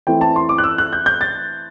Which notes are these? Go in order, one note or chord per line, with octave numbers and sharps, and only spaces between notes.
E3 A3 C4 G5
A5
C6
D6
F#6
E6
F#6
G6
G6
A6